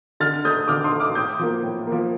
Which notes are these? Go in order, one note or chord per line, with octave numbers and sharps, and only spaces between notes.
D3 F6 A6
A3 D#6 G6
D3 D6 F6
C6 D#6
A3
D6 F6
A2 D#6 G6
F3 A#3
A2
F3 A#3